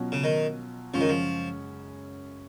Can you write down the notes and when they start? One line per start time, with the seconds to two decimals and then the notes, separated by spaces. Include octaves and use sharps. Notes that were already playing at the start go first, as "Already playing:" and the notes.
Already playing: B2 F#3 C#4 F4
0.12 C#3
0.24 D#3
0.94 F#2 C#3 F3 G#3 C#4
1.01 D#3
1.09 F3